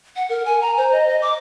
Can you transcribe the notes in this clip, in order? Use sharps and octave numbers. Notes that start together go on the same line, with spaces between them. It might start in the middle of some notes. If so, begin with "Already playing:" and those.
F#5
A#4
G#5
A#5
C5
D#5
D#5
D6